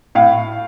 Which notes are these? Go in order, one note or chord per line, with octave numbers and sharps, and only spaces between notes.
A2 F5